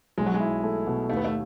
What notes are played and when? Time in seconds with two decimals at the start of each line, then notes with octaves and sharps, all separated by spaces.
0.18 B1 G#3
0.26 F#3
0.34 G#3
0.40 E4
0.63 A3
0.86 B2
1.09 D#2 A3
1.17 B3
1.25 A3